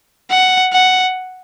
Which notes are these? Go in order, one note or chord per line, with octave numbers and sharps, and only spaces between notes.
F#5
F#5